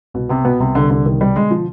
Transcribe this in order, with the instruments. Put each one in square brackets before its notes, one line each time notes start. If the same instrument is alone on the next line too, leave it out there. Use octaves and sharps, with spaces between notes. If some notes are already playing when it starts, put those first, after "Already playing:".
[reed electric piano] C2 [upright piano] B2
[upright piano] C3 [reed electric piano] B3
[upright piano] B2 [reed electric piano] B3
[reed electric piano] C2 [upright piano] C3
[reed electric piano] C2 [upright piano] D3
[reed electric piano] C2 [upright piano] D3
[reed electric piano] C2 [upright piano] D#3
[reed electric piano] B2 [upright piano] G3
[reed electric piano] D3 [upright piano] G#3
[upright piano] F3